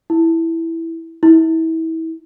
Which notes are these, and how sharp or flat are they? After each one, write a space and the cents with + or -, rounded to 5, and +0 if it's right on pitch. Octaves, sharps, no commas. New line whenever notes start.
E4 +0
E4 -30